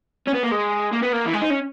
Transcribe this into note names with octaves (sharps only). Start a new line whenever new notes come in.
C#4
B3
A#3
G#3
A#3
B3
A#3
E3
G#3
D#4
C#4